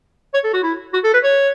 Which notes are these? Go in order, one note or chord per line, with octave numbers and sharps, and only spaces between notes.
C#5
A4
F#4
E4
F#4
A4
B4
C#5